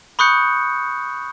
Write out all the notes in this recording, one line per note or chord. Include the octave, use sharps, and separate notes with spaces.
B5 C#6 D#6 F#6 G6 C#7